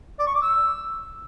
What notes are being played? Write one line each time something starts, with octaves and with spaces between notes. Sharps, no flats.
D5
C#6
D6
E6